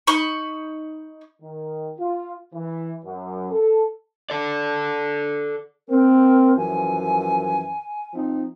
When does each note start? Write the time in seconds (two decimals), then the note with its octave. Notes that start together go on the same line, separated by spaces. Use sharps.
0.07 D#4 B5 C#6
1.41 D#3
1.99 F4
2.54 E3
3.05 F#2
3.51 A4
4.30 A4 D5
5.88 A#3 C4 A#4
6.56 F#2 E3 F3 G#5
8.13 F3 C4 D#4